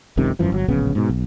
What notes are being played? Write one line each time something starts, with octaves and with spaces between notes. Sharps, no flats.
F#1 C#2 C3 D#3
G#1 F#2 E3 F3
G1 F#3
D1 A#1 C#3 B3
G#2 B2
B1